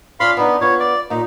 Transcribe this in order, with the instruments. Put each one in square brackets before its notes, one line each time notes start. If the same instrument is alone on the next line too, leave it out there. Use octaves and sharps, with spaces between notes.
[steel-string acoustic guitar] C#4 F4 D5 [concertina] F5 B5 C6
[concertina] B3 [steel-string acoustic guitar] D4 D#4
[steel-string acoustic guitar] B3 F4 [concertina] C#5
[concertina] D5
[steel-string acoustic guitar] D#2 A#2 [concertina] D#4